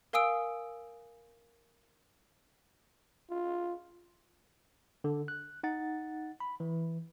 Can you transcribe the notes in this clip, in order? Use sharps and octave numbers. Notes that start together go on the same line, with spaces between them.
A#4 F5 G#5 D#6 E6 D7
F4
D3
F#6
D#4 F#5 A6
B5
E3